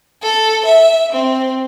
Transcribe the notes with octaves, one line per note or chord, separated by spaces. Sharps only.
A4
E5
C4